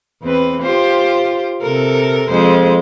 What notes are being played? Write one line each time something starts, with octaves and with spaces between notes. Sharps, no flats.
E2 C4 B4
F4 G4 C5
C3 A4 A#4
F2 G#3 C5